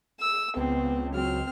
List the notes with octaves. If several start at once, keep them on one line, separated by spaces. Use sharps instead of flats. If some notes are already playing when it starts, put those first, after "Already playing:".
E6
C#2 B3 C4
F#3 C4 F6